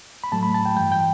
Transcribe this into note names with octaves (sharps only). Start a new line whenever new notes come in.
B5
A2 F#3 A3 A5
B5
A5
G5
G2 E3 G3 G5
G5